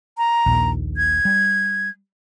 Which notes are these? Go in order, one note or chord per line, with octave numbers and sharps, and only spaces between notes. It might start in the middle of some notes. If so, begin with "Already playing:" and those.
A#5
A#1 D#2 A#2
G#6
G3